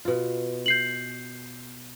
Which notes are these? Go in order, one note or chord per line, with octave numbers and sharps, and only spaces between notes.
B2 F4
G6 C7 F#7